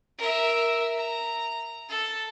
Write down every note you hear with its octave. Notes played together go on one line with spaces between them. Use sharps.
A#4 E5
A#5
A4